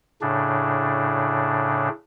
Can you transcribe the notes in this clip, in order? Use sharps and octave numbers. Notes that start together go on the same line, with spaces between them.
A2 C#3 D4